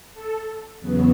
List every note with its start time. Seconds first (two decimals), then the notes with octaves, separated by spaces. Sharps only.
0.13 A4
0.80 E2 C#3 F#3 B3